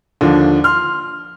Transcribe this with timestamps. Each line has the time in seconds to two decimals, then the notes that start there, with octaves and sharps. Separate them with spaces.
0.21 D#2 D3 F3 D4
0.64 C6 F6